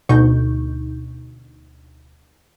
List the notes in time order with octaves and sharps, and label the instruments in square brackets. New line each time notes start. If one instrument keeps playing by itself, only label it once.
[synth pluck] D2 B2 D#4 C#6 G6